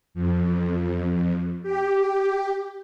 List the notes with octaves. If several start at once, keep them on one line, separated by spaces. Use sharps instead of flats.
F2
G4